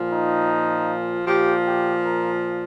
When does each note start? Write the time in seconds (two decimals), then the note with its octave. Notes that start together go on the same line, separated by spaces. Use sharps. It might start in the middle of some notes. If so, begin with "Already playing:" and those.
Already playing: A#2 F3
0.13 D#4
1.27 A#2 F3 G4
1.65 G4
2.03 A#4